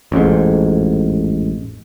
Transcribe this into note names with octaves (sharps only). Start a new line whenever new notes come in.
A1 F2 G#2